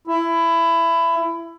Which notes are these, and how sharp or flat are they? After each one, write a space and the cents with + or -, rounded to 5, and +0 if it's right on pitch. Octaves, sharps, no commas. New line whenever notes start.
E4 +20